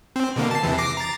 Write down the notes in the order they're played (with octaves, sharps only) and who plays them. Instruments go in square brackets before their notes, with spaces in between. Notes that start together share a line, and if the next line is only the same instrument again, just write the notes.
[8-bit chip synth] C4
B2 D3 A#3
A5 C7
E2 C3 E3
D6 A#6 C7
A#5 A6